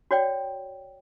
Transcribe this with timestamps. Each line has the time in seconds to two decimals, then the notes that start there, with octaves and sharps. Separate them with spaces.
0.11 F#4 C#5 D5 G5